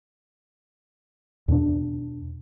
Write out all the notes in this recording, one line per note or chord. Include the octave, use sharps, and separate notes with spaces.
E2 B2 C4 D4